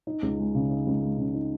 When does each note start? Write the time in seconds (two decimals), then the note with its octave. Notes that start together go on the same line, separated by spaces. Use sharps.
0.07 D#4
0.22 C#2
0.39 G#3
0.55 C#3
0.70 D#4
0.87 C#2
1.02 G#3
1.18 C#3
1.34 D#4